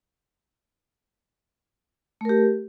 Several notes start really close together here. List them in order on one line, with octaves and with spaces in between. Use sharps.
A3 A#4 G4